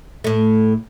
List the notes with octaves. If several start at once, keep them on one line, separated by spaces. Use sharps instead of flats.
A2 A3